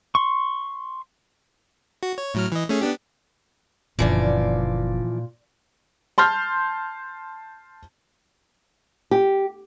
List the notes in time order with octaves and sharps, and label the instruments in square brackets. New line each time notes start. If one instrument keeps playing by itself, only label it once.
[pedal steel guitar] C6 C#6
[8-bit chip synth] F#4
C#5
A2 F#3 F6
E3 D#5
A3 C#4 G#4
B3 D4 G4
[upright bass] F#1 D3 [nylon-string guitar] A#2 [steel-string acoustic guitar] E3 F3 D5
[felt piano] A5 C6 F6 G6
[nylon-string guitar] G4